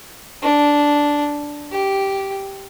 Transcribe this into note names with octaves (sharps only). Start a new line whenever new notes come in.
D4
G4